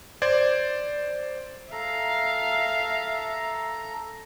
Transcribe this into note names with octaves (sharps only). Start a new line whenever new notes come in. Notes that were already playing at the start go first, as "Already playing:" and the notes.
C5 D5 G#6
A4 E5 F5 A#5